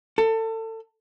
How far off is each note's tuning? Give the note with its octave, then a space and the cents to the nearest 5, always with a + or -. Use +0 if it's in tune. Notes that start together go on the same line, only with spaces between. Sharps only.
A4 +25